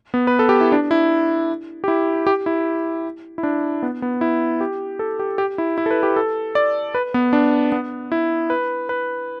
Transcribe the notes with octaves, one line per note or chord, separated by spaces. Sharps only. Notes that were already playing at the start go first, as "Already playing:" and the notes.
B3
B4
A4
G4
E4
D4
E4
G4
E4
G4
E4
E4
D4
B3
B3
E4
G4
A4
G4
G4
E4
E4
A4
B4
G4
A4
D5
B4
B3
D4
B3
E4
B4
B4